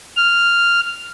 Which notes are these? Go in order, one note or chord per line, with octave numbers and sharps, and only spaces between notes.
F6